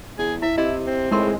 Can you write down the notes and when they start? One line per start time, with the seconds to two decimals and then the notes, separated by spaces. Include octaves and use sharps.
0.19 E2 G#4
0.42 E4 E5
0.58 C3 E4 D#5
0.86 C4
1.11 A2 G#3 D#4 A#4 C6